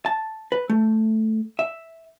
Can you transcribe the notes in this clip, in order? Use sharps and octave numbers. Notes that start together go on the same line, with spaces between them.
A5
B4
A3
E5